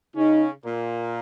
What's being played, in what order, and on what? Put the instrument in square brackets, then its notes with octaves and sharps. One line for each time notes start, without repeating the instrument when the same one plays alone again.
[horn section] C#3 C#4 [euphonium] D#4
[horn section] A#2 A#3